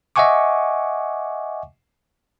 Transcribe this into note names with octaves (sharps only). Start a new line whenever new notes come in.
D#5 E5 F#5 G#5 C#6 D6